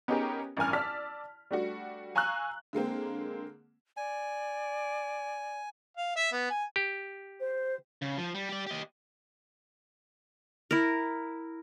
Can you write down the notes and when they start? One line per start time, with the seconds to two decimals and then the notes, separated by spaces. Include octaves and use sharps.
0.08 B3 C#4 D#4 G4 G#4 A#4
0.57 A1 G2 A#4 G#5 F6
0.73 D5 A5 E6 F6 B6
1.51 G3 A3 D4 F#4
2.15 F5 G#5 A#5 C#6 E6 F#6
2.73 D3 G#3 A#3 C4
3.97 D5 G#5
5.97 F5
6.16 E5
6.32 B3
6.50 G#5
6.76 G4
7.40 C5
8.02 C#3
8.18 F3
8.34 G3
8.49 G4 D5
8.66 G4 D#5
10.71 E4 A#4